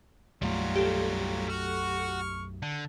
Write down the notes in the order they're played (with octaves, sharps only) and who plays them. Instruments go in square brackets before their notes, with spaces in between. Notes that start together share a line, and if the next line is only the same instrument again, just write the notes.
[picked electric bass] B1 F#2 A3 [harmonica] F#3 [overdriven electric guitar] G3 F4
[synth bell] G4 A4
[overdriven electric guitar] F#4 [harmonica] C#6 F6
[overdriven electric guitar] D3